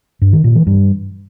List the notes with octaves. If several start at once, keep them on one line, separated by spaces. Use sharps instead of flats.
G2
D#3
A#2
E3
G2